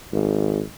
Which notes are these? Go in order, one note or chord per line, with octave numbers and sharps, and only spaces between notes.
G#1